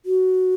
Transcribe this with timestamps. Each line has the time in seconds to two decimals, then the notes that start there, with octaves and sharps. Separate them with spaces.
0.06 F#4